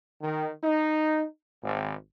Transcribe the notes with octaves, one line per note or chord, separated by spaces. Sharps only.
D#3
D#4
G#1